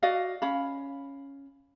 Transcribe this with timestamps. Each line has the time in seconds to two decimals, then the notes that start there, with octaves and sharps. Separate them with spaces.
0.03 F#4 D5 D#5 F5
0.42 C#4 F5 B5